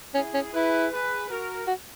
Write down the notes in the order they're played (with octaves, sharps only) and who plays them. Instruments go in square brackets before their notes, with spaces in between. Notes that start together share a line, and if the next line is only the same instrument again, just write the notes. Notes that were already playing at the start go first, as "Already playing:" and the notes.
[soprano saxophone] C#4 [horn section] E4 G#4
[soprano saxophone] C#4
[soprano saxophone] E4 [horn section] G#4 B4
[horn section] G#4 B4
F#4 A#4
[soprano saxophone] F#4